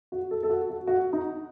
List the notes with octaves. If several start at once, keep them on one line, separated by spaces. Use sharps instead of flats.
F#4
A4
A4
F#4
F#4
F#4
D#4